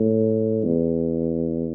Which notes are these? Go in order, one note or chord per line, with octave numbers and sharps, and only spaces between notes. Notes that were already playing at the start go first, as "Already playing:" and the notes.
Already playing: A2
E2